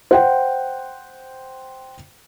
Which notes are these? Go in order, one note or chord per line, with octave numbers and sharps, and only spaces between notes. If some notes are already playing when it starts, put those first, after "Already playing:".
C5 F#5 G5